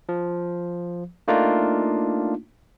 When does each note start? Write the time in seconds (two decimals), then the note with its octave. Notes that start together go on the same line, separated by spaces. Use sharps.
0.09 F3
1.28 A3 A#3 D4 D#4 F4